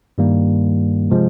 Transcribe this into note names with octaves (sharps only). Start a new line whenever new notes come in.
G2 D#3 G3 A#3
C3 F3 G#3